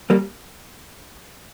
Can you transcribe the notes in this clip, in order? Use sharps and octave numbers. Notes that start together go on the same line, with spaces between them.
G3 A#3